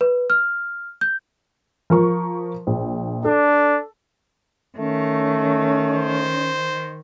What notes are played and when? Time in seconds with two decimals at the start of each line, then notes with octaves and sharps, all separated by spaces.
0.01 B4
0.30 F6
1.01 G6
1.90 F3 A#4 C#6
2.67 A#1
3.25 D4 A4
4.78 D#3 A3 C#4
5.94 C5